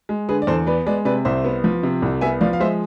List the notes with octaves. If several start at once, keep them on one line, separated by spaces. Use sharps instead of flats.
G#3
D3 G#4 B4
D5
E2 A4 C5
B3 B4 D5
G#3 B4 D5
C3 B4 D5
C2 C5 E5
B3
F3
C3
C2
B3 E5 G#5
F3 D5 F5
F5
G#3 C5 E5